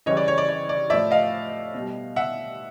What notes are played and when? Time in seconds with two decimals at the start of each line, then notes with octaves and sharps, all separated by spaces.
0.06 C#3 E3 G3 C#5 D#5
0.17 D5
0.28 C#5
0.38 D5
0.49 D5
0.69 D5
0.90 A2 F3 D5 E5
1.11 D#5 F5
1.74 B2 G3
2.16 E5 F#5